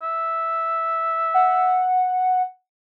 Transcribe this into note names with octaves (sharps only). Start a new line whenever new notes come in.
E5
F#5